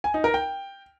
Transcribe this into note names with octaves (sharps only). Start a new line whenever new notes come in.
G#5
D#4
A#4
G5